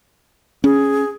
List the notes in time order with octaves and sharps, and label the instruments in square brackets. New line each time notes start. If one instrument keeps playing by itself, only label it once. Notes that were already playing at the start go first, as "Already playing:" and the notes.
[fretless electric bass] C#4 [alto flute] G#4